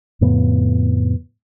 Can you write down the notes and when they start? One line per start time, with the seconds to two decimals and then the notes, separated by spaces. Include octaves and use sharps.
0.21 F2 A2 C#3 B3